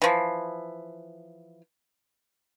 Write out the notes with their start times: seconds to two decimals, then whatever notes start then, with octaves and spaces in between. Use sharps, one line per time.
0.02 E3 F3